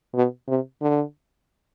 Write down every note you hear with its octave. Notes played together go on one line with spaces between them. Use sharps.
B2
C3
D3